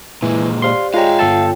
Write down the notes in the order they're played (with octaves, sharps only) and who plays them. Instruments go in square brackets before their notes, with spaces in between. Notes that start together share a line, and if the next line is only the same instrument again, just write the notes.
[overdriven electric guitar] A#2 G#3 [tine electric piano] E3
[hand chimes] G4 C5 D5 [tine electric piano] F5 C6
[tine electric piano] G#3 A#5 [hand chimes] F4 C#5 G5 [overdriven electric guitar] E5 F5
[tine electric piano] G1 A4 A5